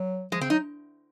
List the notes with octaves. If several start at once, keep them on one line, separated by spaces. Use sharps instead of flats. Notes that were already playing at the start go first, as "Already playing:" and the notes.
Already playing: F#3
F3 G#3
C#3 C4
F#3 D#4